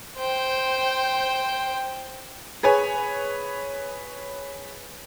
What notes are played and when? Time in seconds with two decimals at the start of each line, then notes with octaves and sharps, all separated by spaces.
0.17 C5 G5
2.63 G#4 B4 C#5 G#5